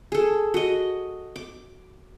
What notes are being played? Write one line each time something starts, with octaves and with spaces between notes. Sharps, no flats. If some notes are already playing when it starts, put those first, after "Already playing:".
G#4 A4
F#4 D#5
D6